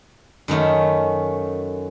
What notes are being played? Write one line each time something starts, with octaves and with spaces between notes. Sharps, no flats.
F#2 D#3 A3 C#4